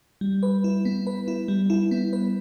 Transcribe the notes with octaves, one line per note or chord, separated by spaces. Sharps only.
G3
B4
E4
B3
B4
E4
G3
E4
B3
B4